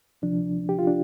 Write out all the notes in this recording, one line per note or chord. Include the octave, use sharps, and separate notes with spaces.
D2 C3 F3 D4
G4
F4
D4